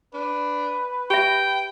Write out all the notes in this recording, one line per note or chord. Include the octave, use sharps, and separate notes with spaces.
D4 B4
G4 E5 G5